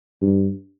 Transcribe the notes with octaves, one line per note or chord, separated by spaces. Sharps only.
G2